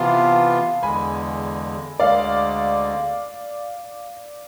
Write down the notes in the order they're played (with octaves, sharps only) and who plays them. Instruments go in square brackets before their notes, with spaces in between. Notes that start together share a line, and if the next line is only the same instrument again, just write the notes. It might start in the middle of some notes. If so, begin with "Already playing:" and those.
Already playing: [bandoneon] C3 E3 B3 F4 [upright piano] F5 A5
[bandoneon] E2 D3 G#3 [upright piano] G#5 B5
[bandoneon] D2 D3 G#3 [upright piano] D5 F5